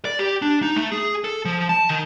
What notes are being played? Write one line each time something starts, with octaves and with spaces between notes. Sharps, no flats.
D5
G4
D4
D#4
A3
G#4
A4
F3
A5
D#3